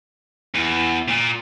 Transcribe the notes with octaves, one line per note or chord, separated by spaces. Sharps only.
E2
A#2